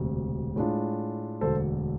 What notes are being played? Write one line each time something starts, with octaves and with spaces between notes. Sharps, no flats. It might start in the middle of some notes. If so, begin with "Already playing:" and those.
Already playing: E1 D2 C3
A2 G#3 D4 F4
E1 D2 D3 A4 C5